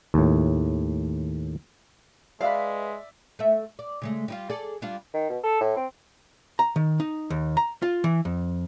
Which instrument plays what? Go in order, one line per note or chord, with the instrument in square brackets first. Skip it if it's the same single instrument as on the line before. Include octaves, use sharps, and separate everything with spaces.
[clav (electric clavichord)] D#2 A2
[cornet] G#3 [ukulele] B4 F5 [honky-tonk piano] D5 E5
[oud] A3 E5
D5
C#3 G#3 A3
G3 D#4 F4
G#4 A4 D5
G3 D4 F4
[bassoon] D#3
B2
A4
A2
C4
[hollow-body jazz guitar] A#5
D#3
D#4
D#2
A#5
F4
E3
F2